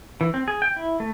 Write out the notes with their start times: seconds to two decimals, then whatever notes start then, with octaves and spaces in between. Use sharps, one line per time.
0.21 E3
0.34 C4
0.48 G#4
0.62 G5
0.76 E4
1.00 A3